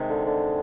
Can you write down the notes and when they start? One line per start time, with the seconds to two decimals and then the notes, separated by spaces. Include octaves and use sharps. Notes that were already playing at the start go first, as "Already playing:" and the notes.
Already playing: C3 D#3 G#3
0.10 D3
0.26 D3